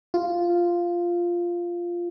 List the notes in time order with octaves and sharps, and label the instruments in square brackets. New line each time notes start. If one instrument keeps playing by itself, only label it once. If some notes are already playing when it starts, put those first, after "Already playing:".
[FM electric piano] F4